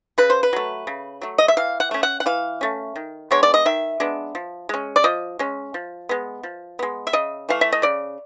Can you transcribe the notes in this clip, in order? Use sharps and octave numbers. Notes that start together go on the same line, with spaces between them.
C#3 B4
C5
B4
F#3 A3
C#3
F#3 A3
D#5
E5
E3 F5
F#5
A3 C#4
F#5
F#5
E3 F5
A3 C#4
D#3
G#3 B3 D4 C#5
D5
D#5
D#3 E5
G#3 B3 D4
F3
G#3 C#4
D5
F3 D#5
G#3 C#4
F3
G#3 B3
F3
G#3 B3
E5
C#3 D#5
E3 A3 F5
E5
D#5
C#3 D5